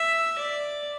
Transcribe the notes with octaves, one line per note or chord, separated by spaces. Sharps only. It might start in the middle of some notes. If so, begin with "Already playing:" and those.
Already playing: E5
D5